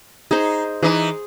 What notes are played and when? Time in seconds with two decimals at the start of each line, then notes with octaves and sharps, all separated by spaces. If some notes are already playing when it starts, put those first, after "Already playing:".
0.31 D#4 G#4 C5
0.83 E3 D#4 G#4